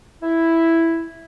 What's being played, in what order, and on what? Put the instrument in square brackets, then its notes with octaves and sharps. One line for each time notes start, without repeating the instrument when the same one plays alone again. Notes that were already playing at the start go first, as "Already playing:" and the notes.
[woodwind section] E4